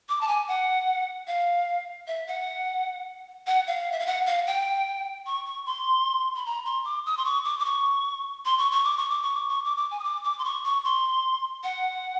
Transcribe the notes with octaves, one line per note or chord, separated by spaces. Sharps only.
D6
A5
G#5
F#5
F5
E5
F#5
F#5
F5
E5
F5
F#5
F5
G5
C#6
C#6
C6
B5
A#5
C6
D6
D#6
C6
C#6
D6
D6
C#6
C6
C#6
C#6
D6
C#6
D6
C#6
D6
C#6
D6
D6
G#5
D#6
D6
D6
C6
C#6
C#6
C6
F#5